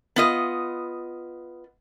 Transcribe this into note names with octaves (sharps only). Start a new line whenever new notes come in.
B3 F4 D#5